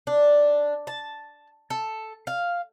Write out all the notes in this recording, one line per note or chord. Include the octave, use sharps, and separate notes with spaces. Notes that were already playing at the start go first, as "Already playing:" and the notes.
D4
A5
A4
F5